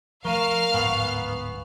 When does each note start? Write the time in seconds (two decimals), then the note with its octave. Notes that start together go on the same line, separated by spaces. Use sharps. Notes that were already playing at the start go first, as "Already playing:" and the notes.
0.25 F3 A3 A#4 F5 C#6 F6 D#7 E7
0.74 D1 G#2 B3 G#5 C#6 F#7